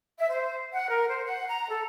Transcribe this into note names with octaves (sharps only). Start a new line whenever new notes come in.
E5
C5
F#5
A#4
C5
F#5
A#5
A4